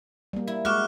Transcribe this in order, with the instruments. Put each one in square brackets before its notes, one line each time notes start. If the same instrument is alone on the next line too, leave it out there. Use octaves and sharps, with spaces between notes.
[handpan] G3 A#3
[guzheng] E4
[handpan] G#3 [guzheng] F#4 [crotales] D6 F6 F#6